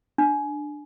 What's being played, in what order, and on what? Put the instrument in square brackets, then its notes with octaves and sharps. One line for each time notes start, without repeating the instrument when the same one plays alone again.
[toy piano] D4